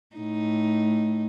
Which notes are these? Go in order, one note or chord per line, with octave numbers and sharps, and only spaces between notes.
A2 D#4